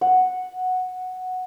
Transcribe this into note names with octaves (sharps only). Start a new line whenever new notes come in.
F#5